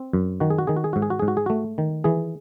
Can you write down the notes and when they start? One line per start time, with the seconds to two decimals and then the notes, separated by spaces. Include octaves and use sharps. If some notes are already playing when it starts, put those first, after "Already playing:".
Already playing: C4
0.13 F#2
0.40 D#3 F#4
0.50 G#4
0.59 F#4
0.67 D#3 G#4
0.77 F#4
0.84 G#4
0.93 G#2 F#4
1.02 G#4
1.10 F#4
1.19 G#2 G#4
1.28 F#4
1.37 G#4
1.46 A3 F#4
1.78 D#3
2.04 E3 G#4